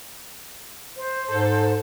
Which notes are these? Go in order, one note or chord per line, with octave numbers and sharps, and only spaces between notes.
C5
G#2 A4